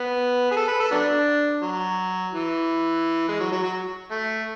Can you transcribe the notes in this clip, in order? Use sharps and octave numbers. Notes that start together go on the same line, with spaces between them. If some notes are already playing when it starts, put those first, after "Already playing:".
Already playing: B3
G#4
A4
B4
A4
F#3 B3 D4
F#3
E3
G#3
F#3
F#3
F#3
A3